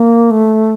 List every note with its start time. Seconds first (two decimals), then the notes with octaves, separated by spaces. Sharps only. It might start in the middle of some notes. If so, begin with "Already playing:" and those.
Already playing: A#3
0.31 A3